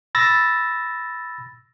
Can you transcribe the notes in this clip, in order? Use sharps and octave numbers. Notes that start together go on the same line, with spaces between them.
B5 E6 A6 A#6